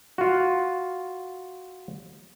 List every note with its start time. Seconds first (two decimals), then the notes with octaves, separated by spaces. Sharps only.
0.18 F4 F#4